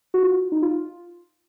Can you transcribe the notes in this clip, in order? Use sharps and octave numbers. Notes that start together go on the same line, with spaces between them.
F#4
F4
D#4
F4